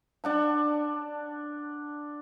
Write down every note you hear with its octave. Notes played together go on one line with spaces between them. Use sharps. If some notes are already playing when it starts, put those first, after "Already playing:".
D4 F#5 A5